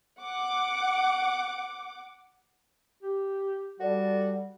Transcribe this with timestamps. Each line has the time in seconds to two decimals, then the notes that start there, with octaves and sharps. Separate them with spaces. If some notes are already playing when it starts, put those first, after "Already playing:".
0.21 F#5 D6
3.03 G4
3.80 G3 F#4 A4 D5